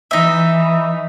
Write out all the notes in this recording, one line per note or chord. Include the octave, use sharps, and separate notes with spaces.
E3 D#4 E5